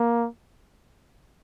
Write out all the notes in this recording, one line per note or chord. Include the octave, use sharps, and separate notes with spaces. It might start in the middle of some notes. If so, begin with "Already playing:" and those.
Already playing: A#3